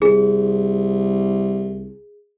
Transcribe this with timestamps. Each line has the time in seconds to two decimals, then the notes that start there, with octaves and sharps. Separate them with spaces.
0.02 C2 G#4